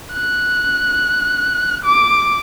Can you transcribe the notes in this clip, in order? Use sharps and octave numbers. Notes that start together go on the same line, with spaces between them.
F#6
D6